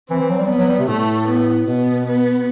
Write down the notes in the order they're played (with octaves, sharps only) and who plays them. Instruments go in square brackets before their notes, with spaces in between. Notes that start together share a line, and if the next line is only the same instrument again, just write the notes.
[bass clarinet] E3 [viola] C4
[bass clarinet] E3
F#3
G3
[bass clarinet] F#3 [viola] B3
[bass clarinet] F#3
G3
C3
[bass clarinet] A2 [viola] A3
[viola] B3
[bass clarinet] B2 [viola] B3
[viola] B3